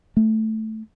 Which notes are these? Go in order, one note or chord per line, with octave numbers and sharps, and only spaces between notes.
A3